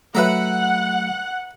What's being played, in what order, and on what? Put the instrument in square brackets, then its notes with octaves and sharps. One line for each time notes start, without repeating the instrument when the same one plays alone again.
[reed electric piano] F#3 A3 [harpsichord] B4 E5 A#5 [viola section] F#5